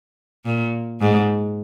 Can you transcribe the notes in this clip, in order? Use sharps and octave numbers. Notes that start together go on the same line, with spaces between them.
A#2
G#2